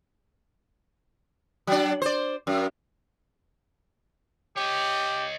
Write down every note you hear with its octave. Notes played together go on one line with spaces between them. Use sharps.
F#3 D4
C5 D5
F#2
G4 C#5 D#5